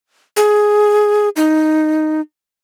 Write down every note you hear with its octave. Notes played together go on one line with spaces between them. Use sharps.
G#4
D#4